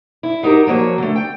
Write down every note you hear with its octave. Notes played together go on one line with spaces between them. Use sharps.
E4
F#3 D#4 G4 A#4
F3 F#3 A#3 C#5
D3 A3
G5